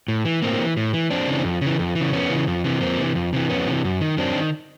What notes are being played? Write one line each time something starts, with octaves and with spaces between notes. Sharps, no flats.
A2
E3
A2 A#3 C4
E3
A2
E3
F2 C4 D4
C#3 E3
F2
C#3 E3
F2
E3
C#3
F2 B3 C#4
C#3 E3
F2
C3 E3
F2 A#3 C4
C3 E3
F2
C3 E3
F2 B3 C#4
C3 E3
F#2
D#3
F#2 C4 D4
D#3